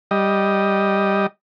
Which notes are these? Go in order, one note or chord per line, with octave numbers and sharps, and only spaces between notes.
G3 D#5